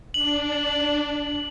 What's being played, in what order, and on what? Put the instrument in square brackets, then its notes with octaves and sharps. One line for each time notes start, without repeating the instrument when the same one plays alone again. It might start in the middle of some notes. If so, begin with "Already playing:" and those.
[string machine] D4 [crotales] F#7